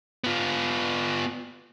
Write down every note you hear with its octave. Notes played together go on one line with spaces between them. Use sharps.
B3 F4